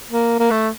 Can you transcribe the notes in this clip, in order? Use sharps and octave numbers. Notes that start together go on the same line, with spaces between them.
A#3
A#3
A3